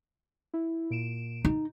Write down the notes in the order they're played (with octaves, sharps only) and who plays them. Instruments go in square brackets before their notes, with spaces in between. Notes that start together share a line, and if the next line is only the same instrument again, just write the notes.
[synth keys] E4
A#2 D7 E7
[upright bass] D#4